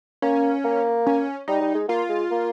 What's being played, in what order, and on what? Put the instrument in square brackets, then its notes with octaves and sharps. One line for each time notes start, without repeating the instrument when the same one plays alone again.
[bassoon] A#3 [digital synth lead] C#4
[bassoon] A#3
[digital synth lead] C#4
[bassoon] G3 [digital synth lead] D#4
[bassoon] G3
G#3
[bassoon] A#3 [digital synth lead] F4
[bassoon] G#3
A#3